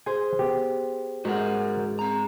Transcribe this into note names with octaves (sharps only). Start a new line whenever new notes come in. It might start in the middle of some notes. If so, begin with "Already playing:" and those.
G#4 C5 G#5
B3 G4
G#2 F#4 A#4 F#5
C4 A#5